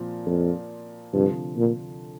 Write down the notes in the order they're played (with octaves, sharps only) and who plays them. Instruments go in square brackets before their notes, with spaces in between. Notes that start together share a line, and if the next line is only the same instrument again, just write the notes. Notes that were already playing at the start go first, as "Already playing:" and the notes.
Already playing: [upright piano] A#2 F3 C4
[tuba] F2
[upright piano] D2 C3 F3 [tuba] G2
[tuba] A#2